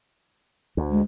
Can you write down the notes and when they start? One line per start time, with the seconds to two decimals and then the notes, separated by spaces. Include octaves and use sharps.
0.77 D2
0.91 G#3